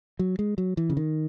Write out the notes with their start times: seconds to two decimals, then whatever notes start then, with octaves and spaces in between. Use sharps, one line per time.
0.19 F#3
0.39 G#3
0.58 F#3
0.77 E3
0.90 C#3
0.97 D#3